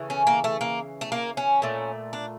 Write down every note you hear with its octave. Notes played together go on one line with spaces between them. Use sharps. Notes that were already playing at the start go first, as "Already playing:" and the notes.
Already playing: C#3 E3 A3
C#4
A#3
A3
A#3
A3
A#3
C#4
A#2 A3
D4